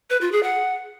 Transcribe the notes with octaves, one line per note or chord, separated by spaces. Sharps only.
B4
F4
G#4
F#5